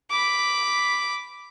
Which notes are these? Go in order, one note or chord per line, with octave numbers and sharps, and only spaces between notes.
B5 D6